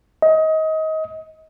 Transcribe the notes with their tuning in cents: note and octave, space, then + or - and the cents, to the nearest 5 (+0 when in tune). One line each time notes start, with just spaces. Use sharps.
D#5 +25